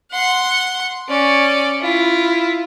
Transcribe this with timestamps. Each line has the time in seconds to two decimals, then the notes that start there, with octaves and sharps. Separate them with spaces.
0.11 F#5 C6
1.09 C#4 D5
1.81 E4 F4